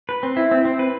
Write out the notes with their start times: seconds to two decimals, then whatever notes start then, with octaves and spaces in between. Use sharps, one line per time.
0.09 B4
0.23 C4
0.37 E4
0.51 C4
0.65 C4
0.79 B4